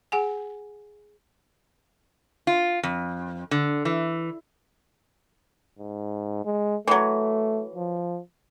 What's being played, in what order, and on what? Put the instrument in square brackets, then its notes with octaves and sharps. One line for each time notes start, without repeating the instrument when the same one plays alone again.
[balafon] G#4 F#5 G#5
[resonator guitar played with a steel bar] F4
F2
D3
E3
[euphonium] G#2
G#3
[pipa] E3 F#3 [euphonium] A3
[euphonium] F3